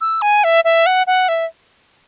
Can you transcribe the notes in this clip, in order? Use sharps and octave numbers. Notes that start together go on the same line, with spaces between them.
E6
G#5
E5
E5
F#5
F#5
E5